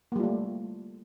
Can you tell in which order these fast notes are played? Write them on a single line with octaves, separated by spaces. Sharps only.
A#3 G3 F4 A3